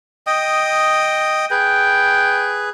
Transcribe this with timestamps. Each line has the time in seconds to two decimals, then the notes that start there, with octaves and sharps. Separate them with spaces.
0.27 D#5 G5 D#6
1.51 G#4 B4 G5